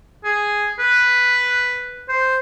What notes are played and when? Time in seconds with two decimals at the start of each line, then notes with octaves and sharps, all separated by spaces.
0.25 G#4
0.79 B4
2.09 C5